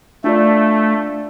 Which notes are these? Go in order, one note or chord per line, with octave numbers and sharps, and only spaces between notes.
A3 D4 F4 D5